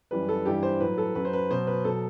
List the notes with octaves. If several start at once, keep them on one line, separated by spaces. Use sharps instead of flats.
F#2 E3 G3 B4
A4
G2 E3 G3 G4
C5
A2 F#3 B4
A4
F#2 F#3 B4
C5
B4
B2 F#3 C5
B4
B2 F#3 A4